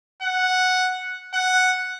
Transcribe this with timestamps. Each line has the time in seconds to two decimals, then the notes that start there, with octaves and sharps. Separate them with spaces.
0.22 F#5
1.34 F#5